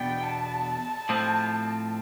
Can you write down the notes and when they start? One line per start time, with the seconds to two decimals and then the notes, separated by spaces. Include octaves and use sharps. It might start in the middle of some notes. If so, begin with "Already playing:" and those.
Already playing: E2 B2 B3 D4 G5
0.23 A5
1.09 A2 F3 C4